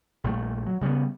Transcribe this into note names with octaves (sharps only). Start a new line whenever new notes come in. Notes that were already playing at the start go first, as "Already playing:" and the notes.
A#1 A#2 G3 A3
F#3
C#3 G3 G#3 B3